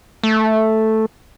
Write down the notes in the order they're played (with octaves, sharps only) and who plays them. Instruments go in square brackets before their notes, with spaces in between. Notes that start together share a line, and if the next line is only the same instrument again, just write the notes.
[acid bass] A3